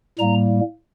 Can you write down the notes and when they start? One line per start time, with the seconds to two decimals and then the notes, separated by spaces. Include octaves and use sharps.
0.19 A2 G3 A#3 A#5